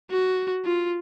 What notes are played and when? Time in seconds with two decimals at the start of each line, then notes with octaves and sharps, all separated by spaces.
0.11 F#4
0.65 F4